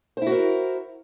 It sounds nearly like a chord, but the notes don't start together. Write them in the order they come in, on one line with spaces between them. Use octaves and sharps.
C5 E4 F#4 A#4